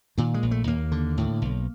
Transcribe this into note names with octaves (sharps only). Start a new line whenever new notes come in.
A#2 D#3
G#3
A#1
A3
D#2 A#3
D3
A2
B1